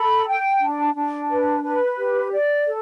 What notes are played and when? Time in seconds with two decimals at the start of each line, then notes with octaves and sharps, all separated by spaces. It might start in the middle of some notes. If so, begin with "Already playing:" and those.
Already playing: A4 B5
0.28 G5
0.61 D4
0.96 D4
1.30 B4
1.63 B4
1.99 G4
2.32 D5
2.66 A4